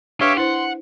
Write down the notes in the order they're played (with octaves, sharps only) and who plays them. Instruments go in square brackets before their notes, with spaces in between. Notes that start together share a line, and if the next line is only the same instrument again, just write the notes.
[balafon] D4 B4 [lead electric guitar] G4 [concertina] C#5 E5 F5
[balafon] E4 C5 [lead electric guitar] F#5 [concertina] C6